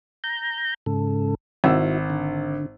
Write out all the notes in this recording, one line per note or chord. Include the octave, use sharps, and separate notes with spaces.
A#5 G6
G#2 C#3 A4
G#1 E4 F#4 E6
D3